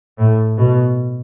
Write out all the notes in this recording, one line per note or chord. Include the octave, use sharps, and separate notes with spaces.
A2
B2